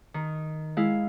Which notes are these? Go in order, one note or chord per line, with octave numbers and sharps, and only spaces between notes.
D#3
G#3 E4 F5